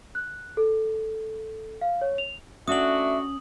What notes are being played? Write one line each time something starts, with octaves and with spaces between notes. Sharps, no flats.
F#6
A4
F5
C#5
F7
A3 C#4 D4 F#4 E5 D#6 F#7